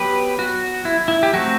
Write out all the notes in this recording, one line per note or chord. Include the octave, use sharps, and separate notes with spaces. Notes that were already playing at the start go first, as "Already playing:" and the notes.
Already playing: F#3 B3 G4 B4
F#4
E4
E4
G4
F#3 A3 C4 F#4